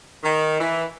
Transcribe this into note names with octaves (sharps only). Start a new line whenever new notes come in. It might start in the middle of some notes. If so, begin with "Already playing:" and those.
D#3
E3